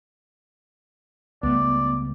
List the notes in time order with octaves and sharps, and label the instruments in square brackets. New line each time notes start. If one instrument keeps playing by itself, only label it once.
[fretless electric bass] C#2 G3 A3 [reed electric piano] B3 [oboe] D5